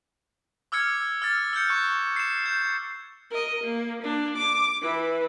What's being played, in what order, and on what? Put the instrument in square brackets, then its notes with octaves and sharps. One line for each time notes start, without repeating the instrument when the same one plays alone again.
[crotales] D6 E6 F6 G#6 C#7
E6 F6 A6
E6 F6 G6 C#7
C#6 F#6
C7 E7
G6
[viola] A#4 D#5
A#3
A#3 D4
D6
E3 B4